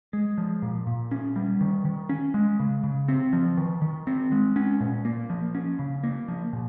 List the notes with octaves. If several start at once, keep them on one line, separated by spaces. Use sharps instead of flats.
G#3
F3
A#2
A#2
C#4
G3
D#3
D#3
C#4
G#3
C#3
C#3
C4
F3
D#3
D#3
C4
G#3
C#4
A#2
A#3
F3
C#4
C#3
A#3
F3
A#2